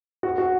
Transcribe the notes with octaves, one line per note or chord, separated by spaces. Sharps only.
F#4
F#4